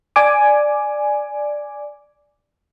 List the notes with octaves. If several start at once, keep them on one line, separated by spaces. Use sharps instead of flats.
D5 G#5 D6